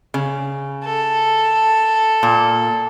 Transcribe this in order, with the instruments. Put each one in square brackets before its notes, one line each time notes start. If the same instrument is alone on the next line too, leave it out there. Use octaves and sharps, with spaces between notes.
[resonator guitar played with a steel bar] C#3
[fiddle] A4
[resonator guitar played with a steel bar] A#2